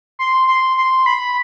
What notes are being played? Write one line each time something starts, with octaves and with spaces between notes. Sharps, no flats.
C6
C6
C6
B5